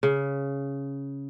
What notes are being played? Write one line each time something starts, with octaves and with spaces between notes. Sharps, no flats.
C#3